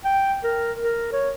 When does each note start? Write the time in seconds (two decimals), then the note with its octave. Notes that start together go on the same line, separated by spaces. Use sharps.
0.05 G5
0.44 A#4
0.81 A#4
1.13 C#5